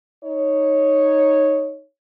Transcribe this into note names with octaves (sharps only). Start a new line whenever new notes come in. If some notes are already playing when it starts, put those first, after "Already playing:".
D#4 C#5